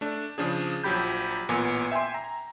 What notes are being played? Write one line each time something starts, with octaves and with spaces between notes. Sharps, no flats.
A3 D4
C#3 F3 D4 G#4
A#1 F3 F#3 G4 B5 G6
A1 A#2 B3 G#5
E5 G5 G#5 C6
A#5